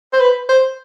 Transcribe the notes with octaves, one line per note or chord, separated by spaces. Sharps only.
C5
B4
C5